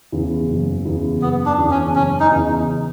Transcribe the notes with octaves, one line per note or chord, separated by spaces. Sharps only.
E2 C#3
F#1
E2 C#3
F#1 B3
D4
E2 C#3
C#4
F#1 C#4
D#4
E2 C#3